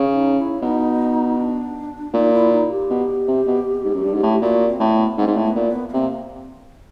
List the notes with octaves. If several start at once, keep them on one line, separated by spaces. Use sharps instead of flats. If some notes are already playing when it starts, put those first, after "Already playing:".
Already playing: C#3
D#4
E4
B2 D#4
D4
A#2 D#4
E4
D#4
G4
B2
C3
B2
G#2
F#2
G2
G#2
A2
A#2 F#4
C4
A2
B3
G#2 C4
G#2
A2
B3
A#2
B3
B3
C3 A#3